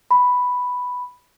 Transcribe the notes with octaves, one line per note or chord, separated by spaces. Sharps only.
B5